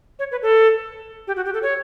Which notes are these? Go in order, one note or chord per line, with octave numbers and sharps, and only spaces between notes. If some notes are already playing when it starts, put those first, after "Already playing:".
C#5
B4
A4
G4
F#4
G4
A4
C#5